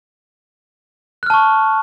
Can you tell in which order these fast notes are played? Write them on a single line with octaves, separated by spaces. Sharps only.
F#6 F6 A5 C#6